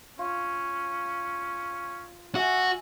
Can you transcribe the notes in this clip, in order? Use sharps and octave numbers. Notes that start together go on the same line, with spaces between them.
C#4 F4
F#4 E5 G#5